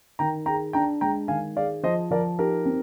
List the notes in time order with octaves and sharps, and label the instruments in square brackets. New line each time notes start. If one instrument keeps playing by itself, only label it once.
[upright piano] D#3 [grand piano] G5 A#5
[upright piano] G#4 [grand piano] G5 A#5
[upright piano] D4 [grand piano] G5 A#5
[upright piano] G#3 [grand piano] G5 A#5
[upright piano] D#3 [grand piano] F5 G#5
[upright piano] G#4 [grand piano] D5 F5
[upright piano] F3 [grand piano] C5 D#5
[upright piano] F3 [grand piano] A#4 D5
[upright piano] D#4 [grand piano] G4 A#4
[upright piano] C4